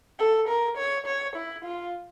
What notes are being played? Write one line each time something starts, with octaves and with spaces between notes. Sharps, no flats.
A4
A#4
C#5
C#5
E4
F4